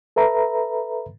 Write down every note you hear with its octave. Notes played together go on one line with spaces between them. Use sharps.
A4 B4 E5 A#5 B5